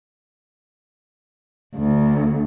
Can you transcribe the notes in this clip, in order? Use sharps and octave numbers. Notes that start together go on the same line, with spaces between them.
D2